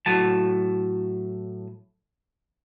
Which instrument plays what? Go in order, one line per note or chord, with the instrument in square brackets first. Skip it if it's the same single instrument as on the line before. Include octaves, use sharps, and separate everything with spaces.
[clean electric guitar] A2 F#3 A5